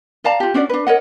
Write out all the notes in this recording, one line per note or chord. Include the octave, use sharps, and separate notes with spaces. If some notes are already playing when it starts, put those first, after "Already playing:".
D5 F5 A5 A#5
F4 G4
C#4 D4 F#4 D5
D4 B4
A#4 C#5 D#5 F#5